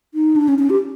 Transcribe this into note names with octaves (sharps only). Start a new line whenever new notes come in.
D#4
D4
C#4
C#4
G4